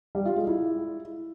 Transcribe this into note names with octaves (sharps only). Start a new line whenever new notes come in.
G3
F4
G#3
E4